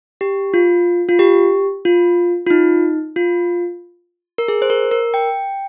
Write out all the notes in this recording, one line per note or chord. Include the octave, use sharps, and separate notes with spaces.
G4
F4
F4
G4
F4
F4
D#4
F4
A#4
G#4
C5
A#4
A#4
G5